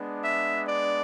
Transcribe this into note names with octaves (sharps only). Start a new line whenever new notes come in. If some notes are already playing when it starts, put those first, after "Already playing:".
Already playing: G#3 B3 D4
E5
D5